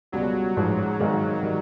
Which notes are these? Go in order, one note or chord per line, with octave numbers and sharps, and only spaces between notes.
C#2 B2 F#3 G3
A1 G#2 F3
G#1 G#2 D#3 G#3
D#3 G3